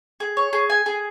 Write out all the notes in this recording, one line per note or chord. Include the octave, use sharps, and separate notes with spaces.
G#4
C#5
G#4
G#5
G#4